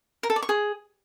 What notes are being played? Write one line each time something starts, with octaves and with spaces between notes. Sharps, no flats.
A#4
A4
D5
C#6
G#4